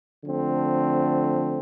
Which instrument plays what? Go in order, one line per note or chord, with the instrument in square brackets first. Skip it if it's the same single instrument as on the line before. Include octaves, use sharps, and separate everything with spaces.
[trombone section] D3 F3 A3 C4